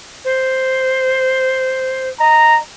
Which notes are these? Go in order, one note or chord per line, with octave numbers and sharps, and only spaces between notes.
C5
D#5 A#5